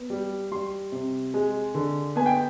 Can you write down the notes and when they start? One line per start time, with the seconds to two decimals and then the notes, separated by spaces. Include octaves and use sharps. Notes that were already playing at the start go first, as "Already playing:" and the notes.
Already playing: B3
0.10 G3
0.52 G3 C6
0.92 C3
1.34 G#3
1.75 D3
2.16 B3 G#5
2.26 G5